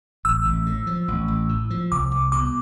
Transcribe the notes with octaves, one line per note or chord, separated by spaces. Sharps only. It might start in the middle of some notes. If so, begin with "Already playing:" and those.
A1 E6
A1
A2
F3
A1
A1
A2
F3
C2 D6
C2
B2 D6